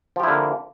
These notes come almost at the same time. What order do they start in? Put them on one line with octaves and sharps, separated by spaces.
F3 G4 E4 D3 A#3